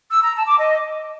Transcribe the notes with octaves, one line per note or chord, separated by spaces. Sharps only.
E6
A#5
A5
D6
D#5